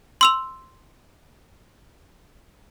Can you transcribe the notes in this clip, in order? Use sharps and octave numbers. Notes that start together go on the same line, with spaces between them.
C6 E6 F7